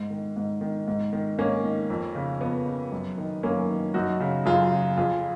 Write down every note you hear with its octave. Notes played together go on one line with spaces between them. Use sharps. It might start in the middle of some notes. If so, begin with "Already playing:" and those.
Already playing: G#2
D#3
G#2
D#3
G#2
D#3
G#2 A#3 C#4
D#3
F2
C#3
F2 B3
C#3
F#2
D#3
F#2 A#3 C#4
D#3
F#2 D#4 F#4
C#3
F#2 F4 G#4
C#3
F2 F4 G#4